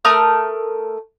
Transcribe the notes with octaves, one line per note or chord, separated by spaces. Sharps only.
A3 A#4 D#6 F6